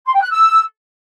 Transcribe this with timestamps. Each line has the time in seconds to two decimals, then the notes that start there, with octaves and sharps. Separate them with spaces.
0.06 C6
0.14 G5
0.22 F#6
0.30 E6